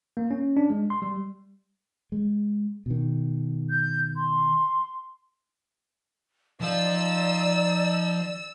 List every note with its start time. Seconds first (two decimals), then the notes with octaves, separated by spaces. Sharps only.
0.17 A#3
0.31 C#4
0.57 D4
0.70 G#3
0.90 C6
1.02 G3
2.12 G#3
2.86 B2 D#3
3.69 G6
4.16 C6
6.60 F3 D#4 D5 F5 E6